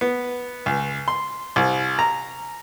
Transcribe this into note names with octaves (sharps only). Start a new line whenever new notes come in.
B3
C#2
C6
C2
A#5